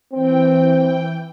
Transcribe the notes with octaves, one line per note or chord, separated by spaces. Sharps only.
E3 C4 G5